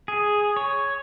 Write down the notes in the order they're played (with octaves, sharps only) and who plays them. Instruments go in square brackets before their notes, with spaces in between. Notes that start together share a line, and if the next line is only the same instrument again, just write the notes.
[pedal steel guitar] G#4
C#5